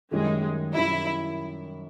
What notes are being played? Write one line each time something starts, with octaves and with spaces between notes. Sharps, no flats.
F#2 D#3 G3 G#3
F#2 D#3 G3 E4